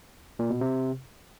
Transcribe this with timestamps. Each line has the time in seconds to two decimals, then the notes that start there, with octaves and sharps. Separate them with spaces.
0.39 A#2
0.50 B2
0.61 C3